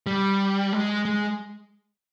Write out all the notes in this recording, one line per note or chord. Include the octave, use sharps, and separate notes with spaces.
G3
G#3
G#3